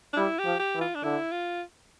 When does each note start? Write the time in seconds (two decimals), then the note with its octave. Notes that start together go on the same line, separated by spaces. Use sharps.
0.13 D4
0.17 G3 E4
0.39 G4
0.45 F3
0.59 G4
0.75 E3
0.81 F4
0.95 D4
1.03 D3 E4
1.32 F4